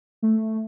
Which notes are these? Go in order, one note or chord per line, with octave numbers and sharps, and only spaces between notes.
A3